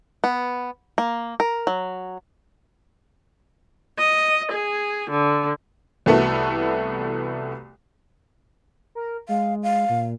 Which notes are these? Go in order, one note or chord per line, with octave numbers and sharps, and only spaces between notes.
B3
A#3
A#4
F#3
D#5
G#4
D3
C2 E3 A3 B3 F#4 A4
A#4
G#3 F5
F5
A#2